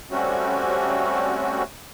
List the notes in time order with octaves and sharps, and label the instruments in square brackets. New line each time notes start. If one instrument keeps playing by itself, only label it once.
[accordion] G3 A3 C4 C#4 F#4